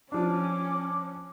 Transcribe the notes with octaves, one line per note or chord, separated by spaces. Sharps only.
F3 C#4 D4 D6